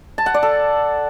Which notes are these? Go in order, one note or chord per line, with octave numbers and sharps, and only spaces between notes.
A5
F#5
D5
A4